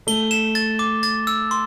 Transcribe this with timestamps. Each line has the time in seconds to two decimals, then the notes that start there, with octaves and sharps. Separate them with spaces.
0.07 A3 G7
0.31 E7
0.55 A6
0.79 D6
1.03 A6
1.27 E6
1.51 C6